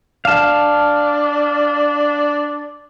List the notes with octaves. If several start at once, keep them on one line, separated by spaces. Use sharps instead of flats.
D4 F5 A5